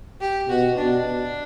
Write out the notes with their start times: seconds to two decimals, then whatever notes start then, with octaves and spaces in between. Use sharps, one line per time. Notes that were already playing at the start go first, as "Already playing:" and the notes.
0.21 G4
0.49 B2 F#4
0.78 B2 D4